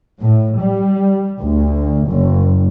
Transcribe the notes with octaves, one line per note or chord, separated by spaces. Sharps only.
A2
G3
D2
F#1